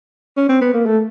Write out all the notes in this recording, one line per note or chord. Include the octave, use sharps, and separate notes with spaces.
C#4
C4
B3
A#3
A3